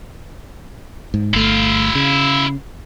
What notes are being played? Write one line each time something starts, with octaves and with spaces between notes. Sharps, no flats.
G#2
G1 A3 E4 F5
C#3